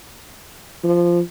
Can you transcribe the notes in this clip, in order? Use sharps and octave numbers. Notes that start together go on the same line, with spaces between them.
F3